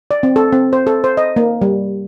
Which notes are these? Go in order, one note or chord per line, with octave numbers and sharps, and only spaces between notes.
D5
C4
A4
C4
C5
A4
C5
D#5
A#3
G3